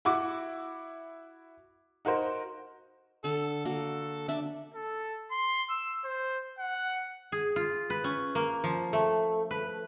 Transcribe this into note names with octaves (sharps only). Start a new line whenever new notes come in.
E4 F#4 D6
D#4 F#4 A#4 C5
D3 A4
A#3 F#4 A4
D4 E5
A4
C6
E6
C5
F#5
G#4
F4
B4
C#4
A#3
F3
A3
B4